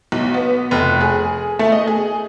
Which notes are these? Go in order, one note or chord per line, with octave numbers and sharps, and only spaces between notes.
B1
B3
F1
G#4
A3
D#5
G#4